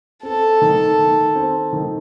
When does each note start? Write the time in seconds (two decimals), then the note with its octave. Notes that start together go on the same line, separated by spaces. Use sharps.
0.23 C4 A4
0.62 D#3
0.99 D#3
1.35 C4
1.73 D#3